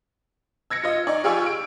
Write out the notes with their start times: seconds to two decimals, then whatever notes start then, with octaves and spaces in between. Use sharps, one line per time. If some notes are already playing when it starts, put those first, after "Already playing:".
0.70 E6 G#6 A#6 C#7
0.83 F4 D#5
1.07 D#4 D5 C#6
1.24 F4 G4 G#4 C#6 E6
1.46 D7